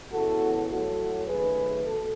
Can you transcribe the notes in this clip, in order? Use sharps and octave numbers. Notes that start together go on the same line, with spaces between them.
E2 C#3 E3 F#4 A4
A2 F#3 A3 F#4 A4
F#2 D#3 A3 G#4 B4
B2 A4